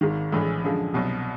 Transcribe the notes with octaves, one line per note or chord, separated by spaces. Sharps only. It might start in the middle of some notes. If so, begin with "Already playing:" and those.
G#1 G#2 D#3
A#1 A2 E3 G#3
F#2 D3 F3 G#3
C2 B2 F#3